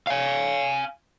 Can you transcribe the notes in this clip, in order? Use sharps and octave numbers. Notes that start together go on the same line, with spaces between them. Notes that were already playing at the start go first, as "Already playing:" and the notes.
F5 G#5